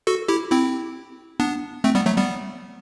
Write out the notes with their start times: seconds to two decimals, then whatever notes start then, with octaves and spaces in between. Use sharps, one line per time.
0.07 F#4 A4
0.28 E4 G4
0.51 C4 E4
1.40 B3 D4
1.84 A3 C4
1.95 G3 B3
2.06 F#3 A3
2.17 G3 B3